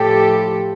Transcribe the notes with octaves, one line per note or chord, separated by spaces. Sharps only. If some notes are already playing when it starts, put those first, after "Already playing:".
Already playing: A2 F3 G4 A4